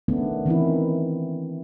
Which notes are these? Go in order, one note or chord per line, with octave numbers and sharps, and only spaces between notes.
D#3 A3 B3 C#4 D4
D#3 E3 C4 C#4 E4